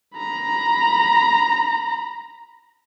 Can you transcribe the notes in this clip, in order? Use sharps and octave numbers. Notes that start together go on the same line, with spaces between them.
A#5 B5